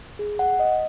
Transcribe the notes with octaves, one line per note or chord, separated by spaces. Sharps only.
G#4
F#5
D#5